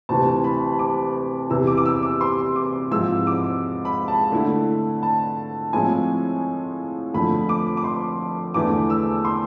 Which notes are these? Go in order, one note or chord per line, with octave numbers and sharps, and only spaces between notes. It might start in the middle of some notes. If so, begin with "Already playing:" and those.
D2 C3 E3 A5
B5
D6
E2 C3 E3 B3 E4 E6
D6
D6
E6
D6
C6
D6
G#2 F3 G#3 C4 E4 E6
D6
B5
A5
D3 A3 E4
A5
A2 F3 G#3 C4 E4 G#5
F2 D3 A3 B5
D6
D6
C6
E2 D3 A3 E4 D6
E6
C6